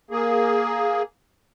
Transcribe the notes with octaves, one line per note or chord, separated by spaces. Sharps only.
A#3 G#4